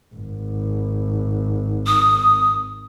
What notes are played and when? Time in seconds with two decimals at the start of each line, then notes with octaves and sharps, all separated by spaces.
0.15 G#1
1.86 D#6